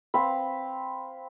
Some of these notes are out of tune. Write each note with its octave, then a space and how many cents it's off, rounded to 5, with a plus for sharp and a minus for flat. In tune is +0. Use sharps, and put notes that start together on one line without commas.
C4 +0 F5 +0 B5 +0